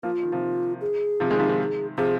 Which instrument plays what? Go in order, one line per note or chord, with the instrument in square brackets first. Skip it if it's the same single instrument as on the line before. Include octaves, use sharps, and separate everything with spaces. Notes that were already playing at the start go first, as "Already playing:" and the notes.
[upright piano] F3 A#3 [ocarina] F4
[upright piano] D#3
C3 F3
[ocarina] G#4
[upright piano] C3 F3
D#3 G#3
C3 F3
D#3
[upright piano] C3 F3 [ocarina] G#4